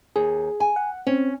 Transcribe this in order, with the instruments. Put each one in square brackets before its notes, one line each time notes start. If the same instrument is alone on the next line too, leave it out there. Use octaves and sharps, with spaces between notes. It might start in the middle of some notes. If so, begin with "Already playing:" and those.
[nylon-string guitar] D#2 [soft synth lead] G#4
[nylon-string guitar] G#5
[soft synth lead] F#5
[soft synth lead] C4 [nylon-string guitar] C#4